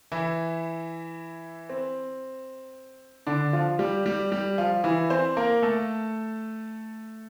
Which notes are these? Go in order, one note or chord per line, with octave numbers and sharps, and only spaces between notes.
E3 E4
C4
D3 D4
F3 F4
G3 G4
G3 G4
G3 G4
F3 F4
E3 E4
C4 C5
A#3 A#4
A3 A4